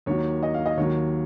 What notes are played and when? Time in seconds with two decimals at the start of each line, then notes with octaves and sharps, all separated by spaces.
0.06 D#2 D#3 F#3 C#5
0.43 D#5
0.54 F5
0.66 D#5
0.77 D#2 D#3 F#3 C#5